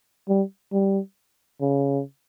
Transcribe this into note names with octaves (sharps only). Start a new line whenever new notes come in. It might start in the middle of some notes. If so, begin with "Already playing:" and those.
G3
G3
C#3